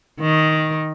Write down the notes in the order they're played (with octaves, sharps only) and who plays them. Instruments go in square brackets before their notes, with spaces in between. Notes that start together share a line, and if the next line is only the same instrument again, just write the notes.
[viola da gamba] D#3